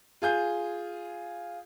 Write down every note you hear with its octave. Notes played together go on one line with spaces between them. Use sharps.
F4 G#4 G6